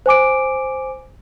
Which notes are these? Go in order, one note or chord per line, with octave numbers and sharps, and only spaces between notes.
C5 G#5 D6 D7